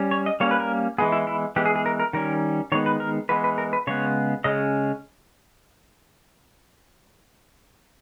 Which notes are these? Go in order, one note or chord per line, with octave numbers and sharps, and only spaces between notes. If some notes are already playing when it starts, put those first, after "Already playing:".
Already playing: G3 C#4
C#5
D#5
G3 A#3 C#4 C#5
B4
A#4
E3 G#3 B3 G#4
E4
E4
E3 G#3 B3 G4
G#4
G#4
A#4
A#4
D#3 G3 C#4 A#4
D#3 G#3 B3 C#5
B4
A#4
E3 G#3 B3 B4
B4
A#4
B4
C#3 G#3 B3 C#5
C#3 G#3 C#4 D#5